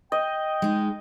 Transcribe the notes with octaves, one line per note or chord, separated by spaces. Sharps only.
D#5 G5
G#3 D#4